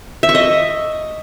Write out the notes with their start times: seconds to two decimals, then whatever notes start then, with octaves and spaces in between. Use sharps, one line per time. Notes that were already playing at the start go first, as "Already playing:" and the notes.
0.23 E5
0.29 C#6
0.35 D#5